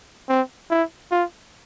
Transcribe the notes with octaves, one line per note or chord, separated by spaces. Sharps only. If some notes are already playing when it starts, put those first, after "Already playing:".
C4
E4
F4